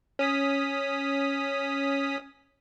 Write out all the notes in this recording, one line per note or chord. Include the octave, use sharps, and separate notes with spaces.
C#4 D#6 B6